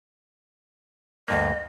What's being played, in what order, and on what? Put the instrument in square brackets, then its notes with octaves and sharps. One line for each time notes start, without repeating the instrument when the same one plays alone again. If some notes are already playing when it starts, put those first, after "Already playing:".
[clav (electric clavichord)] D2 G2 A#3 [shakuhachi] D#5